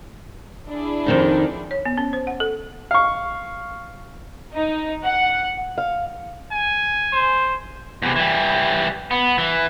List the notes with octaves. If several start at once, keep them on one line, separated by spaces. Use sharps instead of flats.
D4 E4 G#4
F2 D#3 D#4
C#5
B3
C#4
C5
F#5
A4
F5 C#6
D#4
F#5
F5
G#5
C5
E2 C3
E3 G3
B3
E3